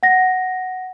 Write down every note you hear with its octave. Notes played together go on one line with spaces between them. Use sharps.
F#5 A#6